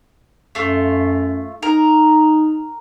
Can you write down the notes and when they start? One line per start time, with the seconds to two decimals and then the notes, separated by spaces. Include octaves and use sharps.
0.55 F#2 A3 F4
1.63 D#4 A#4